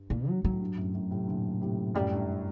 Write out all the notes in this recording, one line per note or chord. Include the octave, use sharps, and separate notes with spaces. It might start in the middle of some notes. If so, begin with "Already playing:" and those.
Already playing: G2
A#2
F#3
F#3
A2
G2
F#2 A2
F#2 A2
A2 C3
A#2 D3
A2 C3
F#2 A2 G3
G2
A2